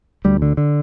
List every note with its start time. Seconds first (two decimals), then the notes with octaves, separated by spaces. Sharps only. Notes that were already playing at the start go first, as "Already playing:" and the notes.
0.25 D2 G3
0.42 D3
0.57 D3